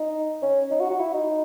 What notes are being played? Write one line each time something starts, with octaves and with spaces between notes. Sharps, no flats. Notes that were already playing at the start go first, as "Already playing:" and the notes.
Already playing: D#4
C#4
D#4
F#4
F#4
E4
D#4